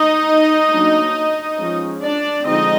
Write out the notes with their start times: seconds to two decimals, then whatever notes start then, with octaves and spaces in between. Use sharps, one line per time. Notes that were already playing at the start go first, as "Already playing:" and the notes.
Already playing: D#4 D#5
0.72 F#3 A#3 D4
1.59 F3 G#3 C#4
2.02 D4 D5
2.45 D3 F3 G#3 C4 D#4 D#5